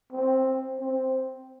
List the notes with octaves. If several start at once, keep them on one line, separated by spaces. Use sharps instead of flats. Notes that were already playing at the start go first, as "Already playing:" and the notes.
C4
C4